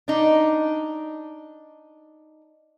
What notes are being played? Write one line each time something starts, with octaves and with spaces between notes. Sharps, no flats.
D4 D#4